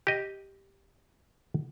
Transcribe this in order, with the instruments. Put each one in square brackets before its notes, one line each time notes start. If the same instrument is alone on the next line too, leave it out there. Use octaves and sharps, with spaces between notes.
[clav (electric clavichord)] G4 D#5